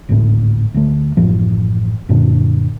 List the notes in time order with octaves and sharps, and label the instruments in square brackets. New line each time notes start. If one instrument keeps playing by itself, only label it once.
[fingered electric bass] G#1 D2 A2
D2 A3
A1 F#2 F3
F#2 A#2 D3 D4